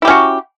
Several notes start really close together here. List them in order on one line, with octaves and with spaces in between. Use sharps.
E4 G4 C#4 F#4